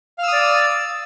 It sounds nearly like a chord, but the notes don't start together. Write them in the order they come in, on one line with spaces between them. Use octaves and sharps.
F5 E6 D#6 D5